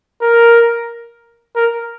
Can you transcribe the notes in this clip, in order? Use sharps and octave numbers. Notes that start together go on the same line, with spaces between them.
A#4
A#4